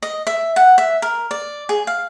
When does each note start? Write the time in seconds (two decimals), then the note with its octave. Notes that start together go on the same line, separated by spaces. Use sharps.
0.03 D#5
0.27 E5
0.56 F#5
0.78 E5
1.02 A#4
1.31 D5
1.69 G#4
1.87 F5